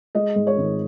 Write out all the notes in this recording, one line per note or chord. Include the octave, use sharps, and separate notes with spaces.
G#3 D#5
G#2
C#5
G#1